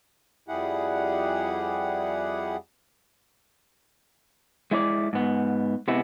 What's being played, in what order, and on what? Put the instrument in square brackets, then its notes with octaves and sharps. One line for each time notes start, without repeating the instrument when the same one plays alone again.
[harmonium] F2 G3 E4 G4 G#4 F#5
[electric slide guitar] G#3 E4 C5 D5
G#2 B3
C3 G#3 B3 E4